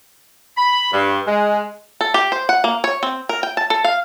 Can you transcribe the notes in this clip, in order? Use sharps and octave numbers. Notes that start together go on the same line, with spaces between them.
B5
G2
G#3
A4
G4
C5
F#5
A#3
C#5
C4
A#4
G5
A5
A4
F5